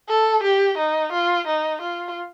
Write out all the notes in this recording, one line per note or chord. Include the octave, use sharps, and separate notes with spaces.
A4
G4
D#4
F4
D#4
F4